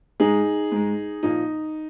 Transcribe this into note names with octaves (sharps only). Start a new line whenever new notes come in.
G#2 G#3 D#4 G#4
G#2 G#3
A#2 F3 A#3 D#4